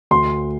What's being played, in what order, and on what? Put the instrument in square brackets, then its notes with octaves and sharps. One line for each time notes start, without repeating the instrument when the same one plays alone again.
[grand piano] D2 C6